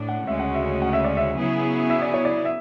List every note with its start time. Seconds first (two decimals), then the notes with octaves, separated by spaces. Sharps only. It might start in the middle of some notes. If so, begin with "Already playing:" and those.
Already playing: A2 D4
0.09 F#5
0.27 D2 C#3 G#3 C#4 F#4 E5
0.40 F#5
0.54 E5
0.82 F#5
0.93 E5
1.05 D5
1.17 E5
1.36 C#3 F#3 B3 E4 G#4
1.90 E5
2.02 D5
2.14 C#5
2.25 D5
2.45 E5